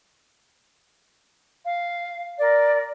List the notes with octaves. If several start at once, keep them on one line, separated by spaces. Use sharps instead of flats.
F5
A#4 D5